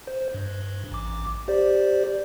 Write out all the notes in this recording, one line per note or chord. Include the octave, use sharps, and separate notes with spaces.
C5
G2
A1 D6
G4 C5 D5